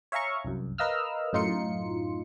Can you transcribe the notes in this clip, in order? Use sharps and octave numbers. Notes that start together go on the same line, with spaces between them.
C#5 E5 F5 G#5 A#5 C#6
C2 F#2
A#4 B4 D#5 F5 E6 F6
F#2 A2 D#4 F4 C6 C#7